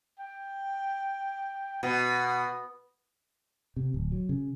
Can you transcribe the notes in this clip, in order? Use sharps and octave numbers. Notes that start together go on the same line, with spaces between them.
G5
B2 F#5
C3
D1
F#3
C#3